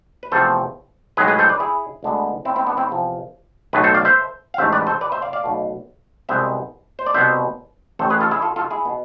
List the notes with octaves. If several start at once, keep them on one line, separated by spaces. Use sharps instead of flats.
B4
E2 C3 F3 A3 A4 C5
B1 A2 G#3 B3 G#4 B4
G#4 B4
A4 C5
B4 D5
E4 G#4
D2 D3 G#3 B3
C4 E4
C4 E4
B3 D4
C4 E4
E2 C3 F3
B1 A2 E3 A3 G#4 B4
A4 C5
D5 F5
C5 E5
F5
A1 G#2 E3 A3 C5 E5
B4 D5
A4 C5
B4 D5
C5 E5
D5 F5
D5 F5
B1 B2 A3
C2 B2 G#3 B3 C5 E5
C5
D5
C2 B2 B3 C5 E5
A1 A2 E3 A4 C5
G#4 B4
F4 A4
E4 G#4
F4 A4
F4 A4
E4 G#4
B2 B3